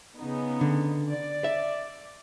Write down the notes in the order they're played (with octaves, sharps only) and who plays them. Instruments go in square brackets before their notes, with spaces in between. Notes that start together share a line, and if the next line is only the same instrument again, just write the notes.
[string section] C#3 B3 D#4
[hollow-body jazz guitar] D3
[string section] D5
[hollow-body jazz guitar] E5